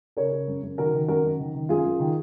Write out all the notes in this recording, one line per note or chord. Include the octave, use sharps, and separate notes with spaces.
C#3 A#4 C#5
C#3
F#2
F#2
D#3 F#4 A#4
D#3
F#2 F#4 A#4
F#2
D#3
D#3
F#2 F4 G#4
F#2
D#3